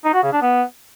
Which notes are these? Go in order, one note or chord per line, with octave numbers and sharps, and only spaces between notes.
D#4
F#4
C#3
D4
B3